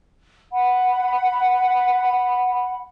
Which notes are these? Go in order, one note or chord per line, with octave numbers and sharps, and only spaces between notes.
F#5 B5